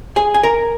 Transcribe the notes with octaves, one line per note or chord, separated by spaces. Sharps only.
G#4 G#5
G#5
A#4 A#5